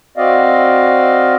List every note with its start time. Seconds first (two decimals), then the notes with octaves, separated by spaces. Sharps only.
0.17 C4 F#4 D5 D#5 F5